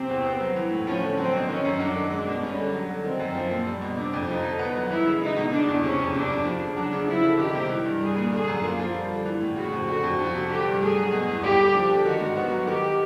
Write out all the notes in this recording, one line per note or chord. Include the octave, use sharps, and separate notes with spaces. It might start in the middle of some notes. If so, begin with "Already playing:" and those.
Already playing: C3 C4
E2
B3
F#3
E3
A2
F3 C#4
D3
F#3 C4
B2
D#3 C#4
F#2
F#3 D4
D#3
G#3 D4
B2
G3 C#4
D3
F#3
D3
D#3 C4
F#2
F3
A#2
G3
B2
C3 D4
F2
F3 D#4
D3
B3
F#3
E3 E4
C#3
G#3 D#4
B2
C#3 D4
E2
C3 C#4
F2
C3 D4
F2
F3
C#3
F#3 D4
C#3
F3 E4
D3
D#3 G4
C3
E3
G2
G3 G#4
A#2
D3 G#4
F#2
A#3 F4
F3
G3
D3
E3
A2
C#3 F#4
F2
D3 F#4
F2
F3 F#4
C3
D3 G4
G2
A3 G#4
F#3
B2
E2
G3 G4
D3
F3
D3
D#3 F#4
G#2
B3 F#4
F#3
D#3 G4